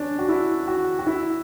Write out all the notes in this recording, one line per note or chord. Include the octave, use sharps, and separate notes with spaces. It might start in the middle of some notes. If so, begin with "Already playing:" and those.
Already playing: C#4 D4
F#4
E4
F#4
F#4
E4